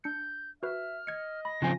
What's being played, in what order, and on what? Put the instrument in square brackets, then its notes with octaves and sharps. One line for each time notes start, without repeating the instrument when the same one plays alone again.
[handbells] D4 C#7 [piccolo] G6
[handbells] F#4 B4 [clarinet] E5 [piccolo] F6
[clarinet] D#5 [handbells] G#6 C#7
[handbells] B5 [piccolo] A#6
[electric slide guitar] C#3 F3 C4 [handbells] F4 G#5